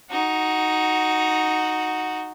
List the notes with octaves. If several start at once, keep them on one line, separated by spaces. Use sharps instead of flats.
D#4 F#4